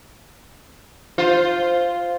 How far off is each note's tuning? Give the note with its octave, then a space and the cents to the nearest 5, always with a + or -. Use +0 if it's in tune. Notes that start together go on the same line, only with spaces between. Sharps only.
F4 +0 C5 -5